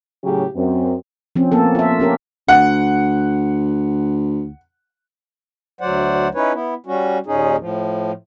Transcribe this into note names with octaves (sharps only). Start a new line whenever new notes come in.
A2 C#3 F#3 C#4 G4 G#4
F#2 C4
F3 C4 C#4
A#3 B3 A4
F4 E5
C#4 G4 A#4
D2 F#5
D2 F#3 C5 D5 F#5
C#4 D#4 E4 B4 C#5
B3 E4
G3 C#4 F#4
D#2 A#2 C#4 D#4 G#4
A2 F3